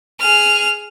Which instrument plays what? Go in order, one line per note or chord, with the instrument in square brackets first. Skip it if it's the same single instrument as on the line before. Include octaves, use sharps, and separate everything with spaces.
[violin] G#4 F6